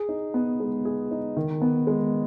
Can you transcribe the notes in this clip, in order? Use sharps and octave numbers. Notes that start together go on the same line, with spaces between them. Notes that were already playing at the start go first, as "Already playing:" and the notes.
Already playing: G#4
D#4
B3
G#3
G#4
D#4
D#3
B3
G#3